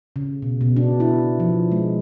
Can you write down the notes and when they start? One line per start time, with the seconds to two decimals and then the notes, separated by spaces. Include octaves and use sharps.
0.16 C#3
0.42 B2
0.61 B2
0.76 D4
1.00 E4
1.40 F3
1.72 G#3